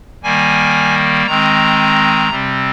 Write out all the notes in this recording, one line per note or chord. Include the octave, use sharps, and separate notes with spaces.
D#3 G3 A#3 G#5
D#3 G#3 C4 A#5
C3 G3 C4